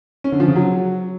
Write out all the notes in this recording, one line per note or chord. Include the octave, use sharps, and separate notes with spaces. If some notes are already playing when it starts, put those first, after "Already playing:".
C#4
D3
F3
C#3
F#3